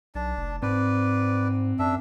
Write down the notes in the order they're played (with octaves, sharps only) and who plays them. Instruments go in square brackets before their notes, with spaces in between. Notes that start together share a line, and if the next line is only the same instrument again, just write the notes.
[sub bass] B1 [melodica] D4 A5
[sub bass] F1
[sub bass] G#2 [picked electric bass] C4 [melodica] B4 D5
[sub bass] F#2 [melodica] D4 E5